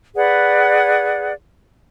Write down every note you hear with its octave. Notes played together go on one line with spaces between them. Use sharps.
G#4 B4 D5 F#5